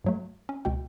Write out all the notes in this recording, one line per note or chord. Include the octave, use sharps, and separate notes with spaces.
G2 F#3 A3
C#4
C#2 B2 G5